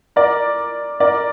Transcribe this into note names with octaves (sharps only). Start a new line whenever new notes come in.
A#4 D5
A#4 D5